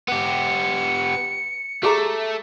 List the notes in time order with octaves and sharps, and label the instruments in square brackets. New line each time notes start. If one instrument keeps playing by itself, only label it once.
[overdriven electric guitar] B3 G4 [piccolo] C#7
[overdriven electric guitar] A3 [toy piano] G4 G#4 A#5